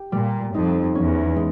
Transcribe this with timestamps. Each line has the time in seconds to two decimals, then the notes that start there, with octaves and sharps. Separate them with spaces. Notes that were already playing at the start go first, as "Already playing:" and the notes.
Already playing: G4
0.12 A#2 G3
0.54 F2 D#4
0.95 E2 C#4
1.36 G#3